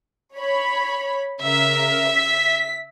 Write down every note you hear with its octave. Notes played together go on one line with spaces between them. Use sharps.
C#5 B5
C#3 A#4 E5
B6